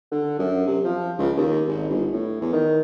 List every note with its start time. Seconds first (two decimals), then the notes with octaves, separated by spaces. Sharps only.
0.12 D3
0.39 F#2
0.67 C3
0.84 F3
1.19 C#2
1.37 D#2
1.67 G#1
1.89 G1
2.12 A2
2.41 E2
2.53 D#3